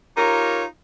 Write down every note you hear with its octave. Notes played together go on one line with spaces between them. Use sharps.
D#4 F4 G4 A#4 C#5